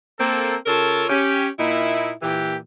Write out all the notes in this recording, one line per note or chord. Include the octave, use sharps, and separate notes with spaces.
A#3 C4 A4
C#3 F4 A4 A#4 C#5 A5
C#4 G4
A#2 A#3 D#4 E4
A#2 E3 G4